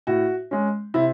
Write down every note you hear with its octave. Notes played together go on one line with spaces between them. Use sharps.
A2 F#4
G#3 C#4
C3 E4